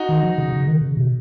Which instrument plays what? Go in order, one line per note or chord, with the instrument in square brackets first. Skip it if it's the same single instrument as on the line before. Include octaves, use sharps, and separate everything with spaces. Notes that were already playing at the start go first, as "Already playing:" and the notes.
Already playing: [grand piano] D#4 F#4
[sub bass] D#3
F3
C#3
C#3
D#3
C#3
B2